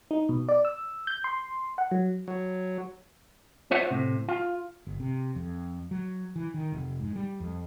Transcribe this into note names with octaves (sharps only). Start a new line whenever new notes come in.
D#4
B2
D5
E6
G6
C6
F#5
F#3
F#3
F4 C5 C#5 E5 F#5
A2 C3
F4
G1
C3
F2
F#3
E3
D#3
F1
G#2
G3
F2